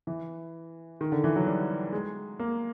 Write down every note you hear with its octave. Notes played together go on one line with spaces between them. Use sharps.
E3
D#3
D3
E3
F#3
G3
G#3
A#3